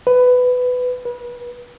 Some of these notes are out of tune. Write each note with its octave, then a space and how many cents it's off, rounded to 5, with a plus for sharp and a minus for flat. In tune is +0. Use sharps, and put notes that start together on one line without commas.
B4 +15
B4 -30